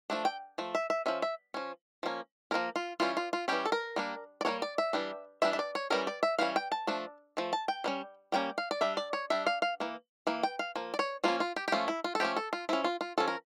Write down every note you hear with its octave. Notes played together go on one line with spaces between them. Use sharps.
F3 A3 D4
G5
F3 A3
E5
E5
F3 C#4 E5
E5
F3 C#4
F3 A#3 C#4
F3 A#3 C#4 A#4
F4
E3 G3 C#4 F4
F4
F4
E3 G3 C#4 G4
A4
A#4
G3 A#3 D4
D5
G3 A#3 D4 C#5
D5
E5
E3 G3 D4
E3 G3 D4 E5
E5
D5
C#5
E3 G3 C#4 A#4
D5
E5
E3 G3 C#4 F5
G5
A5
F3 A3 D4
F3 A3
A5
G5
G3 A#3 C#4
G3 A#3 C#4 G5
F5
D5
G3 D4 E5
D5
C#5
G3 D4 E5
F5
F5
E3 A#3
E3 A#3
G5
F5
F3 A#3
D5
C#5
F3 A#3 C#4 F4
F4
G4
G4
F3 A3 C#4 F4
E4
F4
A4
F3 A3 C#4 G4
A4
F4
F3 C#4 E4
F4
F4
F3 C#4 A4
A#4